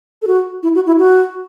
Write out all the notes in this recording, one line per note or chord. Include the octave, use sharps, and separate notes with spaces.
A4
F#4
E4
F#4
E4
F#4